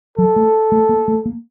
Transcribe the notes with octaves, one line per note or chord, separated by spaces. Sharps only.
F#3 A4
A3
A3
A#3
A3
A#3